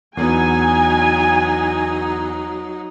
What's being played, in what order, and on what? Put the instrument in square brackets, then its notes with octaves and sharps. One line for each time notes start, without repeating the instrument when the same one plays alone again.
[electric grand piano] E2 B3 [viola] F#3 D#4 [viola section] G#5